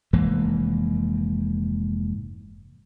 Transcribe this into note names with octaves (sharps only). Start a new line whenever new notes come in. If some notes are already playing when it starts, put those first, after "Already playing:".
F1 G#2 E3 A#3